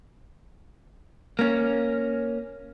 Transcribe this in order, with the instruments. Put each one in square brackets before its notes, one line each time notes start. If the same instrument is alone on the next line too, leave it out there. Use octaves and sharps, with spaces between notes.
[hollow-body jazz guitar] A#3 C#4